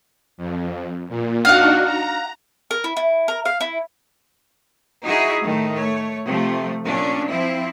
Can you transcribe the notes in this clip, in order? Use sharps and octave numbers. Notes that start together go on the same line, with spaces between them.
F2
A#2
D4 D#4 F#4 F5 F#5
A#5
A#4
E4
E4
A#4
F5
E4
D#4 E4 F#4 G#4 E5
A2 D#3 A3
A3 C#5
C3 F3 A3
A#2 C#4 D4
F3 C4 E4